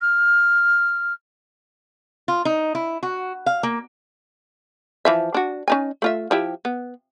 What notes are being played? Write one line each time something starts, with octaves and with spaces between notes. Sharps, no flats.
F6
F4
D#4
E4
F#4
F5
A#3
E3 F3 E5
D4 F#4
C#4 D#4 G#5
A3 F4 E5
F3 E4 G4
B3